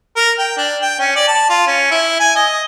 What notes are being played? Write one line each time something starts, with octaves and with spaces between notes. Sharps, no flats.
A#4
G5
D4
G5
C#4
D5
A5
F4
C#4
E4
G#5
D#5